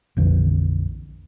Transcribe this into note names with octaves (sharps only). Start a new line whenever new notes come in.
A#1 F2 D3 E3